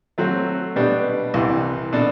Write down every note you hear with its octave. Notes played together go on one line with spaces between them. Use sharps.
F#3 A3 C4 F#4
B2 G3 B3 D4 G4
C2 C3 E3
B2 A3 D4 A4